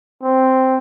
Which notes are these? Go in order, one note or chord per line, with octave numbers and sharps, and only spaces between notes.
C4